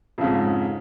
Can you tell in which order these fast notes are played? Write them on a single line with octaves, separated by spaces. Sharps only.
F2 C#3 G#2